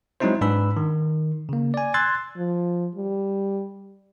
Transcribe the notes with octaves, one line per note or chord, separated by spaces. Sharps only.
F#3 G#3 C4 D#4 E4 C5
G#2 D4 B4 B5 E6
D#3
C#3 A#3
D5 G#5
C6 E6 F#6 G#6 A6
F3
G3